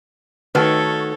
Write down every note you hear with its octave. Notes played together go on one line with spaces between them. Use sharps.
D#3 A3 D#4 F#4 A4 B4 C#5